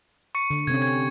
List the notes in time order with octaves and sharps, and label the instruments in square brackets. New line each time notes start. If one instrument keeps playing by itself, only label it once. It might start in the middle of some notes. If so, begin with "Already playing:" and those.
[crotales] C#6 C#7
[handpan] D3
[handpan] C3 C4 C#4 [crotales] G#6
[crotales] G#6